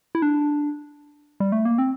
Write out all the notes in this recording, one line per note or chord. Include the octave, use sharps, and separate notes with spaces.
E4
D4
G3
A3
A#3
C4